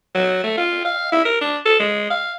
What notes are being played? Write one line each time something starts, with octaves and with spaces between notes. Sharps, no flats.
F#3
A3
F4
F5
E4
A#4
D4
A4
G#3
F5